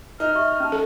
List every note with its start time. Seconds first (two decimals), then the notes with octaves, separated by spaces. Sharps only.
0.20 D#4 F6
0.35 E5 C#6
0.60 C#4 A5
0.72 A4